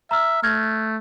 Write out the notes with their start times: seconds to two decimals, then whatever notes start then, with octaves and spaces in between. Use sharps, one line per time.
0.11 E5 A#5 E6 F6
0.43 A3 F6 G#6 A#6